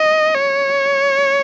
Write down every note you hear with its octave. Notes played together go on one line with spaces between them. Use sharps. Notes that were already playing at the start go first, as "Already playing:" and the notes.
Already playing: D#5
C#5